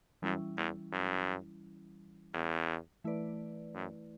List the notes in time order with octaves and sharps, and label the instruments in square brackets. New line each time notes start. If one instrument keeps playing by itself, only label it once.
[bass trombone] F#2 [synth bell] E3 G3 C#4 E4
[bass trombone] E2
F#2
E2
[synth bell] E3 A3 E4 B4 D5
[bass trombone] F#2